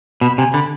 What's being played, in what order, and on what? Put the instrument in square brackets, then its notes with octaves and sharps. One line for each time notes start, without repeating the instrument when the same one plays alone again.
[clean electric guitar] B2 [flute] B5
[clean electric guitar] C3 [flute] G#5
[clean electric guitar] D3 [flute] B5